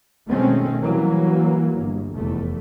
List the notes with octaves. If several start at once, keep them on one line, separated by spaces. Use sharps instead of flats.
B2 D#3 G#3 A3 C4 C#4
E3 F#3 G3 A#3
G1
F1 E2 A3